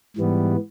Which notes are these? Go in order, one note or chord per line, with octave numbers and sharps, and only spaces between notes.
G#2 E3 G3 B3